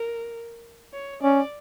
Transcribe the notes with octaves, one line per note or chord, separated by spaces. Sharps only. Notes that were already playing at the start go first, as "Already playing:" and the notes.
Already playing: A#4
C#5
C#4 D5